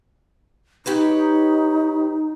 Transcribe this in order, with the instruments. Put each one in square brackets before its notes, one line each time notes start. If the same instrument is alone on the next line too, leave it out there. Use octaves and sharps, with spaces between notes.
[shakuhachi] D#4 [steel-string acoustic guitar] G4 B4 C#5